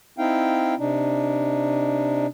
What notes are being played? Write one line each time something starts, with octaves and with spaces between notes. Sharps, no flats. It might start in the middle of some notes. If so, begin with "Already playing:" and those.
C4 D#4 E4 F5 G5
C3 D4 D#4